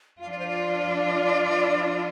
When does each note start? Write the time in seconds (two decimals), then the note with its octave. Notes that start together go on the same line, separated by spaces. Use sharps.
0.21 F3 D4 F4 F5
0.31 D5
0.39 C5
0.48 D5